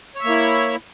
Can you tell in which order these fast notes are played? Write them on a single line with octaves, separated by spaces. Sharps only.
C#5 E5 A#3 E4